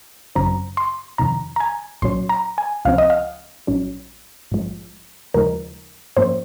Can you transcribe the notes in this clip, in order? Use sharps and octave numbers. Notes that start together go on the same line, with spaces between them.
G#1 F#2 C#3 F#3 C4 A#5
C6
F2 C3 D#3 A#5
A#5
G#5
C2 A#2 F#3 C#4 C6
A#5
G#5
C#2 C3 F3 C4 F5
D#5
F5
A#1 G#2 F#3 C#4
A#1 G#2 F3 G#3
D#2 C#3 F3 G#3 D#4 A#4
G#2 F3 A#3 C#4 C5